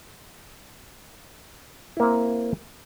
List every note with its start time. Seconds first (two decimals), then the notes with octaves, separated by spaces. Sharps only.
1.97 E4
2.00 A#3
2.03 C4